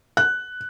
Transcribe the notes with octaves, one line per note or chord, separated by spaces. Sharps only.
F#6